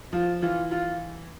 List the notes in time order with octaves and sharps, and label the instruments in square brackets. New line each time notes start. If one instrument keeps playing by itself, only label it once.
[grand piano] F3 [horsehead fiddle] F4
[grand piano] E3 [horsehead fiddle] F4
[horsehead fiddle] F4